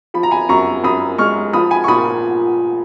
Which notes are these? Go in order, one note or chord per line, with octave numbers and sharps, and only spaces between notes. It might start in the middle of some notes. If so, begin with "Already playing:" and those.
F3 B5
A#5
G#5 B5
F#2 A#5 C#6
F#2 B5 D#6
G#3 C#6 F6
F3 B5 D#6
G#5 B5
C#6
A#2 B5 D#6